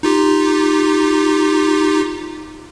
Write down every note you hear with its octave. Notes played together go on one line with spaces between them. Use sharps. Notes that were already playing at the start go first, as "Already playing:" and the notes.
D#4 F4 G4